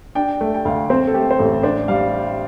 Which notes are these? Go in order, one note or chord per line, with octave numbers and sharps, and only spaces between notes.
D4 G5
A3
G5
D2 F5
C4 C5
A4
A3 G4
C5
A1 A4
D4 C5
G3 F5